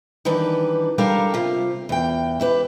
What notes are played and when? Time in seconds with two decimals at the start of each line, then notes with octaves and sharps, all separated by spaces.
0.25 D#3 E3 G3 D4 B4
0.98 G3 D4 G4 A4 A#4 F5
1.34 C3 F4
1.89 E2 G5
2.40 E4 G4 B4